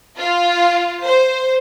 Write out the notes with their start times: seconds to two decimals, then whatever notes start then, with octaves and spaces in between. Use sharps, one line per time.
0.18 F4
1.04 C5